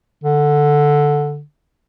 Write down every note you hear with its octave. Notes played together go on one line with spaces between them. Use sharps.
D3